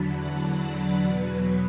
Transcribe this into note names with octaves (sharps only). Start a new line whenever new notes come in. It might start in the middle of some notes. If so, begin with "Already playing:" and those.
Already playing: E2 D3 F#3 A5 B5
F#5
D5
E2 B2 F#3 B4